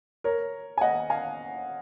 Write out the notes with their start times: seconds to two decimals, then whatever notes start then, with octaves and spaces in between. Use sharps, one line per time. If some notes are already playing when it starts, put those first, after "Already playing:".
0.24 A#4 C#5
0.78 G#5
0.81 D#5 F#5
1.10 F5 G#5